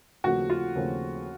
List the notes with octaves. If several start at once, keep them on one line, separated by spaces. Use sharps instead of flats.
D#2 C#3 F3 A3 C4 F#4
F4
D#2 C#3 F3 A3 C4